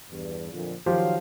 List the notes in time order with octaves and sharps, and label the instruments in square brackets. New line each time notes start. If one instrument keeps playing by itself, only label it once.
[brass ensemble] E2 G2
F2 A#2 D3
[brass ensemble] D#3 F#3 F5 [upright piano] F3 G4 C5